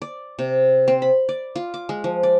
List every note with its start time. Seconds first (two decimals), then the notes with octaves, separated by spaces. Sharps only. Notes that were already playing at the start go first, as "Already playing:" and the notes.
0.02 D5
0.39 C3
0.88 C4
1.02 B5
1.29 D5
1.56 F4
1.74 D6
1.89 G#3
2.04 F3
2.23 D5